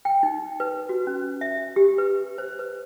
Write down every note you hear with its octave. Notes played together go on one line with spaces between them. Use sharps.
G5
D#4
B4
F#4
C#4
E5
G4
B4
C5
B4